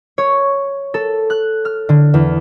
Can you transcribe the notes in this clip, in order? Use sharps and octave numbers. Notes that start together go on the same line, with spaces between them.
C#5
A4
F#6
F6
D3
E2